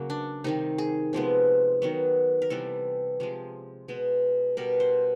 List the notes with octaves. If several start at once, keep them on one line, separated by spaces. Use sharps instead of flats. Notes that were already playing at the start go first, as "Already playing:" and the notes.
Already playing: C#3 F#3 A#3
D4
C3 D#3 G3 D#4
G#4
C3 F3 G#3 B3
D#3 F#3 B3
A#4
C3 E3 G3 B3 A4
C3 F3 G#3
B2 G#3 B3
B2 G3 B3 A#4
C5